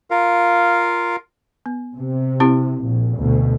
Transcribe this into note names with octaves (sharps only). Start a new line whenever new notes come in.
F4 A#4 F5
B3
C3
C4 E4 G4
A#1
D2 B2